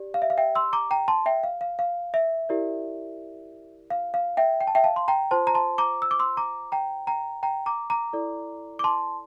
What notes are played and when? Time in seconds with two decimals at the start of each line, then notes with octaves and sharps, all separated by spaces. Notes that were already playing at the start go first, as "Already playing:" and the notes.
Already playing: G4 D5
0.14 F5
0.22 E5
0.30 F5
0.37 E5 G5
0.55 C6 E6
0.73 A#5 D6
0.91 G5 A#5
1.08 A5 C6
1.26 E5 G5
1.44 F5
1.61 F5
1.79 F5
2.14 E5
2.49 E4 G4 A#4 D5
3.90 F5
4.14 F5
4.37 E5 G5
4.60 G5
4.67 A5
4.75 E5 G5
4.84 F5 A5
4.96 C6
5.08 G5 A#5
5.31 F4 C5 A5 C6
5.47 A#5
5.54 A5 C6
5.78 A#5 D6
6.02 E6
6.11 D6
6.19 C6 E6
6.37 A#5 D6
6.72 G5 A#5
7.07 G5 A#5
7.43 G5 A#5
7.66 A#5 D6
7.90 A#5 D6
8.13 E4 A4 D5
8.79 D6
8.84 A5 C6